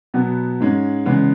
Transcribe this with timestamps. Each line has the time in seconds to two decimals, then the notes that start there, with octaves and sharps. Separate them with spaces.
0.14 B2 F#3 B3
0.60 G#2 G#3 C#4
1.06 E2 C#3 G#3 B3